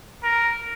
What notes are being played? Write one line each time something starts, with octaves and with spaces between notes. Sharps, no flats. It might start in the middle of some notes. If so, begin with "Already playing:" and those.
A#4